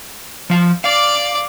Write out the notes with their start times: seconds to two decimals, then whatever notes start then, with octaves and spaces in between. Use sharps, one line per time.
0.50 F3 F5
0.84 D5 F5 D6